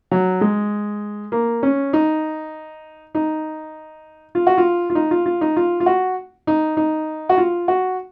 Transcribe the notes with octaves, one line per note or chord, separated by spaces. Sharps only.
F#3
G#3
A#3
C#4
D#4
D#4
F4
F#4
F4
F4
D#4
F4
F4
D#4
F4
F4
F#4
D#4
D#4
F#4
F4
F#4